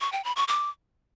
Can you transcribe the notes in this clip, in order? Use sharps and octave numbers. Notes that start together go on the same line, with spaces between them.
C#6
G5
B5
C#6
D6